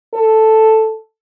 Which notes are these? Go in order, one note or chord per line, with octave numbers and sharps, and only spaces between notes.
A4